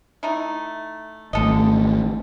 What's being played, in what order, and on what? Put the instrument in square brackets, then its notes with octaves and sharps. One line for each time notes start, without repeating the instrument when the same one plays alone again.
[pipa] A3 D#4 E4
[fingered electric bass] G#1 A3 [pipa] D3 A4 D#5